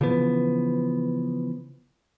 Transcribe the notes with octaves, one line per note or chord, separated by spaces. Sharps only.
C#3 E3 F3 B3